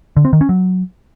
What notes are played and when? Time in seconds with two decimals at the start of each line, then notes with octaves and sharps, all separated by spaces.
0.17 D3
0.25 C4
0.33 D#3
0.41 C#4
0.49 F#3